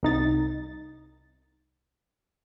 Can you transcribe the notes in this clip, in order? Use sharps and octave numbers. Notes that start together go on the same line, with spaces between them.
C2 D#4 A6